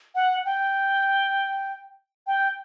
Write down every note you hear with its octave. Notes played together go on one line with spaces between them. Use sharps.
F#5
G5
G5